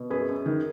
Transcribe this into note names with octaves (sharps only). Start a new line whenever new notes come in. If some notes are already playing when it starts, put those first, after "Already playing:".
Already playing: B2
F#2 G#4 B4
F#2
D#3